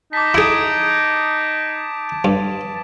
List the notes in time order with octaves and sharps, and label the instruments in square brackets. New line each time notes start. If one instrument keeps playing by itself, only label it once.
[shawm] D#4 [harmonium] A5 [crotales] D6 B6
[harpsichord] E4 G#4 [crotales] D#6 G#6 D7
[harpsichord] G2